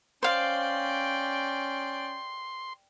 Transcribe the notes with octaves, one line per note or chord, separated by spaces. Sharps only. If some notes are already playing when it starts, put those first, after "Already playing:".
C#4 C5 D5 F5 G5 C6